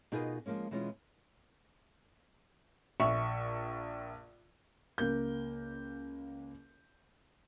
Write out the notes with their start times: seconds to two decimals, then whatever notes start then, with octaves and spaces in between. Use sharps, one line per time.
0.12 B2 D#4 F4 G#4 A#4 B4
0.46 F3 G#3 A#3 C#4
0.71 B2 E3 G#3 C#4 F4
3.00 A#1 E5 C#6
4.98 C#2 A#3 A#4 G6